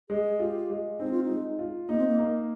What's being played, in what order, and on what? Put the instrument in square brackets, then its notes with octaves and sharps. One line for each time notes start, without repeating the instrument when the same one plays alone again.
[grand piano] G#3 [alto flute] G#4
[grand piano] F4 [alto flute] G4
[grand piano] G#3
[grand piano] C4 [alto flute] D#4
[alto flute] F4
D#4
[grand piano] G#3
F4
[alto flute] A#3 [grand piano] D#4
[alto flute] C4
A#3
[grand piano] A#3